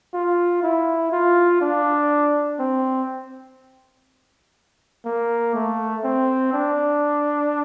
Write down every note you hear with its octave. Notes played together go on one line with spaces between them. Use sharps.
F4
E4
F4
D4
C4
A#3
A3
C4
D4